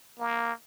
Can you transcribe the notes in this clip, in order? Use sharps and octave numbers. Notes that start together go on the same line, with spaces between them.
A#3